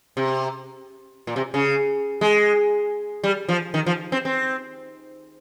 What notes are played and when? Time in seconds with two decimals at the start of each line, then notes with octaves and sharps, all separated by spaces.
0.17 C3
1.27 A#2
1.36 C3
1.54 C#3
2.21 G#3
3.24 G3
3.49 F3
3.74 D#3
3.86 F3
4.12 C4
4.25 C4